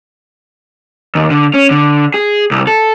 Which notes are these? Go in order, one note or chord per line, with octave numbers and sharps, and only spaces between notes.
D#2
D3
C#4
D3
G#4
C2
A4